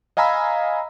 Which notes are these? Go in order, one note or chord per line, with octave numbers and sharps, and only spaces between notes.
D#5 F5 G#5 A#5 B5 E6